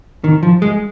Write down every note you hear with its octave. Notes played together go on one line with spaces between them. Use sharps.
D#3
F3
G#3